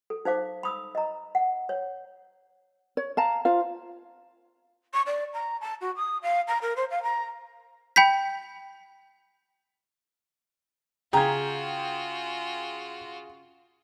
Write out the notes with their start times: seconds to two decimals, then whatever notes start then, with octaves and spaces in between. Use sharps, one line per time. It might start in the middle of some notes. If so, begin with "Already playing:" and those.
0.10 A4
0.25 D#4 C5 F5 D6
0.63 B5 D#6 E6
0.95 D#5 A#5
1.35 F#5
1.69 C#5
2.97 C#5
3.17 F5 A5 A#5
3.45 F4 C5 F5
4.93 C#6
5.06 D5
5.33 A#5
5.61 A5
5.81 F#4
5.96 D#6
6.22 F5
6.47 A#5
6.62 A#4
6.76 C5
6.90 F5
7.02 A#5
7.96 G5 B5 G6 B6
11.13 C#3 F4 F#4 G#4 G5 A#5 G#6